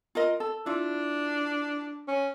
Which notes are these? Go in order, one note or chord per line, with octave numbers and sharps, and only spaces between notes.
F4 A#4 D#5
A4
D4 E4 F4
C#4